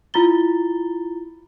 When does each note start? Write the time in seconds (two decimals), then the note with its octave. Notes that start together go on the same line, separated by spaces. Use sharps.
0.14 E4 F4 A#5 B5 A6 G7